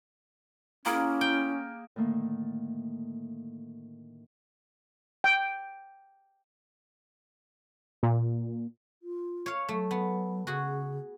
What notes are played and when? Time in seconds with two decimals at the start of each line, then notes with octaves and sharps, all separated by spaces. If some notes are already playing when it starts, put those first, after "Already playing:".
0.86 A#3 C#4 E4 G#4 A#4
1.21 G5
1.96 A2 D3 D#3 A3 A#3
5.24 G5
8.03 A#2
9.03 F4
9.46 C#5 F5
9.69 F#3 A3
9.91 B3
10.47 C#3 F#4 G#4